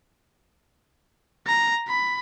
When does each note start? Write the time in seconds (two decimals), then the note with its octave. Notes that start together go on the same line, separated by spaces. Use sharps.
1.47 A#5
1.88 B5